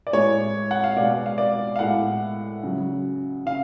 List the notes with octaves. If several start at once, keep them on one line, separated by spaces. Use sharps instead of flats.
D5
A2 G#3 C#5
F#5
F5
B2 G#3 D5
F5
D5
F5
A2 G#3 F#5
C#3 F#3
C#3 F5